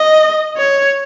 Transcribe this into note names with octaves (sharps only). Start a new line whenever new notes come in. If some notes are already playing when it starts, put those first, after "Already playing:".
Already playing: D#5
C#5